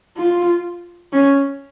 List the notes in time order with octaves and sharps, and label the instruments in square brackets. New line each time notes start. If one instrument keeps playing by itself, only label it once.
[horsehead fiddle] F4
C#4